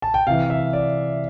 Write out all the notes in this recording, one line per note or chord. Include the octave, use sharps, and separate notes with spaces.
A5
G5
C3 E3 F5
E5
D5